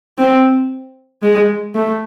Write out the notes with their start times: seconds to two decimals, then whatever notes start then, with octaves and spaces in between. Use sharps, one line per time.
0.18 C4
1.22 G#3
1.75 A3